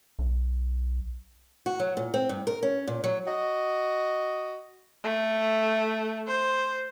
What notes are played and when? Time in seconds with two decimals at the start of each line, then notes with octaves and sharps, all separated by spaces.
0.19 B1
1.66 F#4
1.79 F#3
1.97 A#2
2.14 C4
2.29 G2
2.47 A#4
2.63 C#4
2.87 A#2
3.04 F#3
3.27 F#4 D#5
5.04 A3
6.28 C5